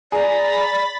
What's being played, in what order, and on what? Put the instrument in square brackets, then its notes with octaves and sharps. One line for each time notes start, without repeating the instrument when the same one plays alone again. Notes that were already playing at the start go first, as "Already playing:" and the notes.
[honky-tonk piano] G#4 [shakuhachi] D5 [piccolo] A#5 [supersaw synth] B5 A6 B6